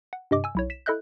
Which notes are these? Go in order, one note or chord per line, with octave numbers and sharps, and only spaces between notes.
F#5
G2 C3 D#5 D6
G#5 E6
B1 E4 C#5
B6 E7
E4 A4 D#5 E5 F#6 G6